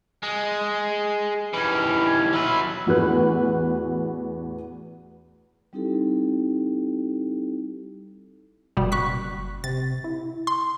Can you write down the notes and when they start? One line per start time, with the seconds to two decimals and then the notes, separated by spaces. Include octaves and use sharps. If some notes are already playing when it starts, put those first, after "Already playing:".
0.23 G#3
1.54 D#2 E3 C#4
2.33 F#3 B4 E5
2.86 A1 E2 F#4 G#4 B4 F#6
5.73 G3 C4 D#4 E4 G4 A4
8.77 F#1 B2 G3
8.92 C#6 F#6 B6
9.64 C3 A6
10.04 E4
10.47 C6